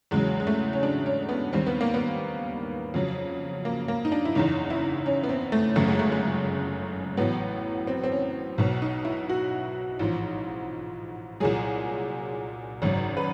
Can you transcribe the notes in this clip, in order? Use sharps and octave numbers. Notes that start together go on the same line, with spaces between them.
E2 C#3 F#3 G#3
G#3
A3
C#4
D4
C#4
B3
D#2 D#3 G3 C4
B3
A#3
B3
F2 C#3 F#3
A#3
A#3
D#4
D4
E4
F#1 E2 C#3 E3 D#4
E4
C#4
B3
C4
A3
G1 F#2 C#3 A3
G#3
A3
G#3
A1 A2 F#3 B3
C4
C4
C#4
B1 B2 F#3
D#4
E4
F#4
A1 G#2 F3
C2 A#2 F#3 G#4
G#1 F#2 C#3 F#3
B4